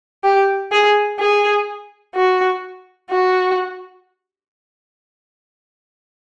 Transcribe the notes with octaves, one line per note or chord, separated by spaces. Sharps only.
G4
G#4
G#4
F#4
F#4